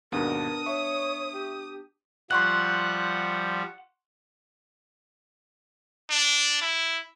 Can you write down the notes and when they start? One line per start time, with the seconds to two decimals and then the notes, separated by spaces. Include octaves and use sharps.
0.12 D#2 G#2 B2 B3 D4 A#4 F#5 D#6
0.66 C#5 E5 C#6
1.33 G4
2.31 F3 G3 F#5 C6 C#6 F#6
6.10 D4
6.61 E4